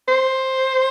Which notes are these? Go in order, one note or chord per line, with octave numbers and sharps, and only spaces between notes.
C5